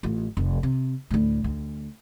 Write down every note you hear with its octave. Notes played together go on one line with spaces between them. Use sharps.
A1 F4
F1
C3
D2 A2
D2